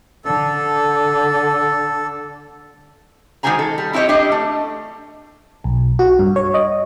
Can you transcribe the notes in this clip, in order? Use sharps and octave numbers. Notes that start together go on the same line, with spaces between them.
D3 A4
D#3 G#3 F#4 C5 G#5 A#5
A4
G3
C4 E4 G4 C#5 D#5
D4 G4 D#5
A3
B1
F#4
G2
C#5
D#5